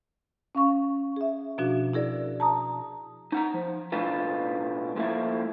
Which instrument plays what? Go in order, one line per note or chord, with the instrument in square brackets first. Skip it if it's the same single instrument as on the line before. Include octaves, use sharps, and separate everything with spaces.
[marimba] C#4 F5 C#6
G#4 E5
B2 F3 D4 F#4
E4 G#4 A#4 D5
A5 A#5 D#6
[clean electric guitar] D#4 F#5 A#5
F3
B1 A2 D4 F4 B4
F3 A3 A#3 E4